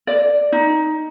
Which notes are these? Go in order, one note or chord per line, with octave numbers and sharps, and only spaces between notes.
D5
D#4